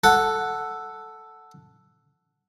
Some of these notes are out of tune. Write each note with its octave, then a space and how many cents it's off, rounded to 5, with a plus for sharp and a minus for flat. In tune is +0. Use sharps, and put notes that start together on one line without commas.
A4 +0 F#5 +0